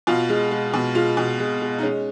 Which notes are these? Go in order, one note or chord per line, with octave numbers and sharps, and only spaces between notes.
B2 F4
G#3
G#3
B2
G#3 F4
B2
G#3
G#3
D#4
G#3 C#4